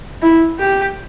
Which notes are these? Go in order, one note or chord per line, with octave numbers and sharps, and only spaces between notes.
E4
G4